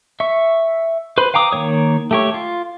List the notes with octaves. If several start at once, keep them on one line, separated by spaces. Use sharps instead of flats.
E5 C#6
B4 C5 B5
F5 G5 A#5 D6 D#6
D#3 A#3 C#5 D#6
A3 G4 C#5
F4